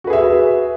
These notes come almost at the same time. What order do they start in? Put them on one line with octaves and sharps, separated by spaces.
F#4 B4 G#4 E5